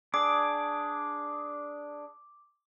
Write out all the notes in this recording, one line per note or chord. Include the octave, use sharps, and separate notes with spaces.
D4 G#4 D6